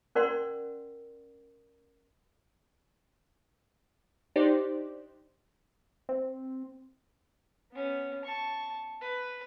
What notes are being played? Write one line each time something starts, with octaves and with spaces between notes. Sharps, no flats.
C#4 A#4 D5 F#5 C6
D4 D#4 G4 C5 D5
C4
B3 C#4
A5 C#6
B4